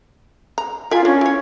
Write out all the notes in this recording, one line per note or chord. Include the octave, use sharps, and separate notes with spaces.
A#5
F4 A#4 E5 G#5
C#4 D4
E4 C#5